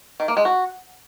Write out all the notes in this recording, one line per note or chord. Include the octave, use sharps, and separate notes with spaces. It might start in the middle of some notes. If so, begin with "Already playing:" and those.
D#3
A#3
G#3
F#4